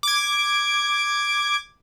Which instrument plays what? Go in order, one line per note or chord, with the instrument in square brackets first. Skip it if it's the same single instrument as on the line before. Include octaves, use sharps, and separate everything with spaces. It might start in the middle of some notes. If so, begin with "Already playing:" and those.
[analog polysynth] D6 G#6